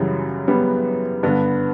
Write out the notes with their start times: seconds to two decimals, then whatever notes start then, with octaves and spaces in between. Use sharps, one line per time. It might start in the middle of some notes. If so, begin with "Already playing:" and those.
Already playing: F#2 C#3 E3 G3
0.48 G3 B3
1.23 G2 D3 B3 D4